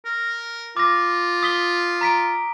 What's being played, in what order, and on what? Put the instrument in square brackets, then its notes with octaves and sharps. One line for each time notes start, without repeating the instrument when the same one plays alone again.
[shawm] A#4
[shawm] F4 [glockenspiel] D6 A#6
[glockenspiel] D#6 B6 G7
A#5 B6 D7